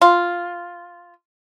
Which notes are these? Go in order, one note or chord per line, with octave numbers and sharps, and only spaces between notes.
F4